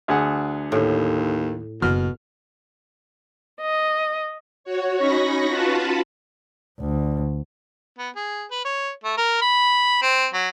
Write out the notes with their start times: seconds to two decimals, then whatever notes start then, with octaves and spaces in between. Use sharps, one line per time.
0.08 D2 G#4 F#5
0.72 D#2 A2
1.82 F#1 B2 F6
3.60 D#5
4.64 F#4 C#5
4.98 C#4 D#4 B5 C#6 A#6
5.48 F4 F#4 B4 A5 B5
6.81 D2
7.98 B3
8.16 G#4
8.51 B4
8.65 C#5
9.04 A3
9.18 A#4
9.42 B5
10.02 C4
10.34 F#3